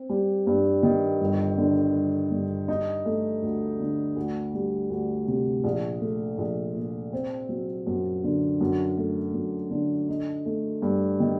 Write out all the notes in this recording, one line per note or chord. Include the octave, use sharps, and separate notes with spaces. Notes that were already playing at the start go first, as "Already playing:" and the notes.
Already playing: C4
G3
G2
D#3
G1
D3
G1
G2
D#4
A3
D2
D3
D2
G3
D2
C3
A#1
A3
A#1
A#2
C4
F#3
F#2
D3
F#2
A3
F#2
D3
D#4
A3
G2
D#3